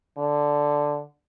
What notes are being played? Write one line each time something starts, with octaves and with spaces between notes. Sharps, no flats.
D3